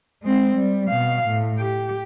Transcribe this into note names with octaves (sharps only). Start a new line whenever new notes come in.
G#3 C4
G3
B2 F5
A2
G4